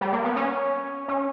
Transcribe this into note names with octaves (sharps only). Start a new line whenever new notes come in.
G3
A#3
B3
C#4
C#4